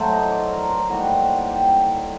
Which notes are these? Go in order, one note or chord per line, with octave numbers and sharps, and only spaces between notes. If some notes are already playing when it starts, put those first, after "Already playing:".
Already playing: A2 F#3 A3 A4 C5
D#5
D5
A#4
C5
A2 G3 A#3 D#4 F#4
G4
G4